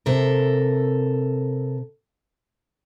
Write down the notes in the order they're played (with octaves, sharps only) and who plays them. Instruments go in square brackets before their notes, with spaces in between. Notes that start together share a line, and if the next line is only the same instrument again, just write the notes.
[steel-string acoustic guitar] C3 A4 A#4